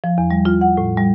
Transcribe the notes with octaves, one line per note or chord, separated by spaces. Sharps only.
F3
E2
G3
F4
F#5
A2
G3